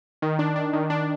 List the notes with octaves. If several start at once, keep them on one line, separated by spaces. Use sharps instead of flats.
D#3
D4
D4
D#3
D4